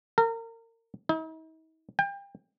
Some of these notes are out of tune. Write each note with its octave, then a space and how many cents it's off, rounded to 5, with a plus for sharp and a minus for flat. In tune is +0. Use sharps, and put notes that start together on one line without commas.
A#4 -30
D#4 +45
G5 +30